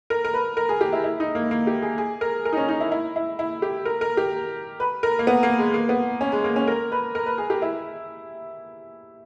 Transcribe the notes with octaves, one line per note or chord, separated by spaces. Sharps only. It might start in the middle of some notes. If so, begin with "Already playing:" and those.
A#4
A#4
B4
A#4
G#4
G4
E4
E4
D#4
A#3
A#3
G4
G#4
G#4
A#4
A#4
D#4
C#4
D#4
E4
E4
E4
E4
G4
A#4
A#4
G4
B4
A#4
A#3
B3
A#3
G#3
A#3
B3
C#4
G#3
A#3
C#4
A#4
B4
A#4
B4
G#4
G4
E4